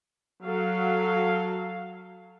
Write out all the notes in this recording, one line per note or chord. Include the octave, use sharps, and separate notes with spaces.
F#3 A4 F5